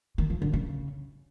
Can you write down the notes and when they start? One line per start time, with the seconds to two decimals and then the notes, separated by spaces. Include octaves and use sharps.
0.18 D#3
0.30 F3
0.42 D3
0.53 C#3